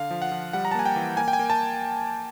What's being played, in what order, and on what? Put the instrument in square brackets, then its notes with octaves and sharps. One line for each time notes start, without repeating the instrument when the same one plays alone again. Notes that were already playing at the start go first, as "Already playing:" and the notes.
Already playing: [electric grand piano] D3 F5
F3
F#5
F3
G3 F#5
A#5
A5
A#3 G#5
G5
E3
A#3 G#5
G5
G#5
A#3
A5